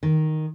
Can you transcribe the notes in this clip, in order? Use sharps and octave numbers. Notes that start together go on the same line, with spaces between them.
D#3